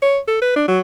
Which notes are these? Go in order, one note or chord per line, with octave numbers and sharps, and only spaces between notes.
C#5
A4
B4
D4
F#3